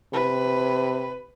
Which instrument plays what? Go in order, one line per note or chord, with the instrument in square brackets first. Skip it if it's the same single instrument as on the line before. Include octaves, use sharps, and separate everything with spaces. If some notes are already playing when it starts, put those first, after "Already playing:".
[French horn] C3 [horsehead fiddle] B4